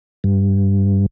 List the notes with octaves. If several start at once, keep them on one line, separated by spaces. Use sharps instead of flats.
G2